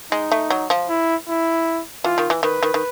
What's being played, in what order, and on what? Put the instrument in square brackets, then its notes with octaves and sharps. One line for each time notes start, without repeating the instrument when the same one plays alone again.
[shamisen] G#3 [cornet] D#4
[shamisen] A3
F#3
F3
[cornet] E4
E4
[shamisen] E3 [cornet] F4
[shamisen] D#3
E3
[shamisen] D#3 [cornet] B4
[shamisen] D#3
D#3